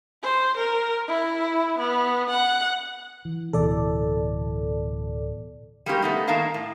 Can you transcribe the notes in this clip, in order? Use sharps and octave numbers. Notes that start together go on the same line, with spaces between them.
C5
A#4
E4
B3
F#5
E3
D1 B2 E3 A4 D5
G3 G#3 A#3 C#4 G4 A#4
A3 B3 D#4
D#3 A#3 D#4 A#4 F5 A5
A2